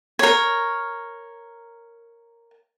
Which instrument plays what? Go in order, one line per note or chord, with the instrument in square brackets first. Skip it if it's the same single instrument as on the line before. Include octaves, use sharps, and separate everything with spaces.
[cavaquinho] A#4 C#5